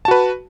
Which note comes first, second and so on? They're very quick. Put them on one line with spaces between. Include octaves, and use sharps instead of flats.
A5 F#4 B4